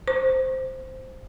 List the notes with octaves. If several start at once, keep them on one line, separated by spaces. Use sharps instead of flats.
C5